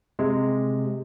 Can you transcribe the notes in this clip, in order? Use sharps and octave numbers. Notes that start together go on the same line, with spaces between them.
C3 G#3